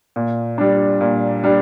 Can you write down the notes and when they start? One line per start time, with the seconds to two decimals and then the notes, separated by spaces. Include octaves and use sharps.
0.16 A#2
0.58 G3 D4
1.01 A#2
1.44 G3 D4